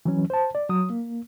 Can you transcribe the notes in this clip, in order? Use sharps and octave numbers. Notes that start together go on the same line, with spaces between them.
E3 F#3 C#4
C5 A5
D5
F#3 D#6
A#3